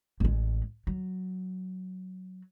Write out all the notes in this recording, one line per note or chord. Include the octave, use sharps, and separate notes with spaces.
A1 G#3
F#3